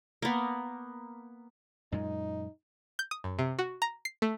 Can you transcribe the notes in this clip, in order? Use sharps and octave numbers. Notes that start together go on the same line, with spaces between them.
A#3 B3
F#2 A#2 G#3 D#4
G6
D#6
F#2
C3
F#4
A#5
C7
A3